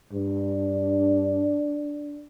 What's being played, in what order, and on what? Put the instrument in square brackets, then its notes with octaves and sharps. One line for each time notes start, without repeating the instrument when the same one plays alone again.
[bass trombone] G2 [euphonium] D4